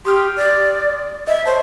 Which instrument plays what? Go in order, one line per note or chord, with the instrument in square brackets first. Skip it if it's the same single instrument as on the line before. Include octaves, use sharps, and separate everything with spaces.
[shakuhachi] G4 [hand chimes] C6 D#6 F6
[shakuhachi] D5
[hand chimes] D#5 [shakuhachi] E5
[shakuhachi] C5 [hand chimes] C#5 A5